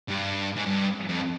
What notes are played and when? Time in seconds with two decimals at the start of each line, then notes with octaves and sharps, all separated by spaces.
0.08 G2
0.56 G#2
0.66 G2
1.09 F2